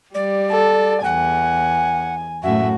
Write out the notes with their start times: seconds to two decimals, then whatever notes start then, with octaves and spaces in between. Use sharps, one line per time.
0.15 G3 D5
0.51 A4
1.04 E2 F#5 G#5
2.43 F#2 A2 F#4 E5